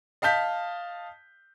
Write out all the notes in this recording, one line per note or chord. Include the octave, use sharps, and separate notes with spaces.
D#5 F5 A5 G6 B6